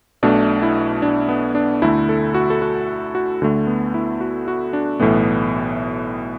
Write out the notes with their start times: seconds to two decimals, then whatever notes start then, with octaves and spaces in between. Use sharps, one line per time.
0.23 B1 B2 A3 D4
0.63 E4
1.02 D4
1.29 B3
1.55 D4
1.82 D2 D3 A3 E4
2.09 A4
2.34 F#4
2.50 A4
2.62 F#4
3.15 F#4
3.42 D2 D3 A3
3.67 B3
3.94 E4
4.21 F#4
4.48 F#4
4.73 D4
5.00 B1 A2 E3 A3 B3